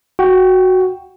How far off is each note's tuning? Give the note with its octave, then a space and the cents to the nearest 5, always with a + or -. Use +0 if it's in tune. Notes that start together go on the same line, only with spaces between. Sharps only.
F#4 +0 G5 +0